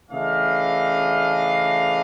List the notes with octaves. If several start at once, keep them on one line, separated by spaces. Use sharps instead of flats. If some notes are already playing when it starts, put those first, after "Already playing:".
C#3 E3 A3 D4 D#5 F5